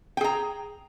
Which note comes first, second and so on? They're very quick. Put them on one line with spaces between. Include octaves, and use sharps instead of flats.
G5 G#4 A#5